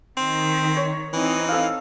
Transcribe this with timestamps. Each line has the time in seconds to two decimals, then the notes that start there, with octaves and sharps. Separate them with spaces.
0.17 D#3 C4
0.77 C#5
1.14 E3 C4 D#4
1.49 A4 F5